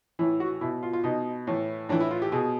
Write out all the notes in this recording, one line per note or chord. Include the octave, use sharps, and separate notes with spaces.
A2 E3 E4
F#4
B2 E4
F4
F4
B2 D#4
A2 E3
A2 E3 D4
E4
F4
G4
B2 G#4